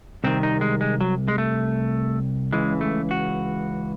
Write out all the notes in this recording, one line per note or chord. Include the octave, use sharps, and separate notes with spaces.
C2 C3 D#3 C4
D#4
G#3
G#3
F#3
G#3
A3
C#2 C#3 E3 G#3
A3
F#4